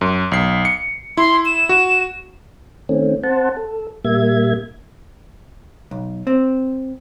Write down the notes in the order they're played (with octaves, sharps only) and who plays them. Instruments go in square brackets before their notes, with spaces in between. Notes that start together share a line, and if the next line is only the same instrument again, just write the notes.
[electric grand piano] F#2
B1 C7
C#7
[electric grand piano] E4 [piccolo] C6
[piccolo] E7
[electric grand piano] F#4
[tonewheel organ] D#3 A3 C4 C#4
C4 C5 F#5 A5
A4
A#2 G3 A#3 E5 G#6
[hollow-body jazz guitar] B1
C4